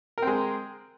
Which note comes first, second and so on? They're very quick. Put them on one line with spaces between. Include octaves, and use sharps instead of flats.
A#4 C4 G#3